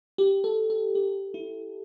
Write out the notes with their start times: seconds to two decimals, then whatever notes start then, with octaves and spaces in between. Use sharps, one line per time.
0.18 G4
0.44 A4
0.70 A4
0.95 G4
1.34 E4